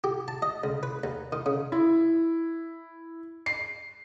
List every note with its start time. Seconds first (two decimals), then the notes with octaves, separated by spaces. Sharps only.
0.04 G4
0.28 A5
0.42 D#5
0.64 C#2
0.83 B4
1.04 D#2
1.32 D#3
1.46 C#3
1.72 E4
3.46 C7